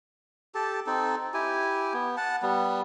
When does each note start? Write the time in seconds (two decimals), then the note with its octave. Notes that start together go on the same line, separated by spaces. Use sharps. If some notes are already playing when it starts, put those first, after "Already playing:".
0.55 G4 A4 A5
0.87 C4 D#4 A4
1.34 E4 G4 G#5
1.93 B3
2.17 F#5 A5
2.42 G3 B3